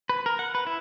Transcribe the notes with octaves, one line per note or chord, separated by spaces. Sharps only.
B4
A#4
F#5
B4
E4